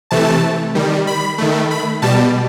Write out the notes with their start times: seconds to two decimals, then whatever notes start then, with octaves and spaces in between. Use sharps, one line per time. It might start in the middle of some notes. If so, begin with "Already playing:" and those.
0.11 C3 E3 A3 A5
0.75 D#3 G3
1.07 B5
1.38 D#3 A3
1.71 B5
2.02 B2 G3 A5